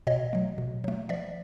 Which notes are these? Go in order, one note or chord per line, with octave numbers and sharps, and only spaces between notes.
B2 C#5 D#5
F#3 A3
B2
F#3 A3
F3 D5 E5